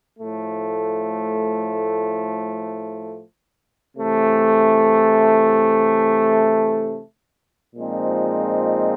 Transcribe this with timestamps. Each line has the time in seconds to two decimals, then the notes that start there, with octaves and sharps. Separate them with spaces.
0.19 A2 F3 A3
3.97 C3 E3 A3
7.75 A#2 F3 G#3 C4 D#4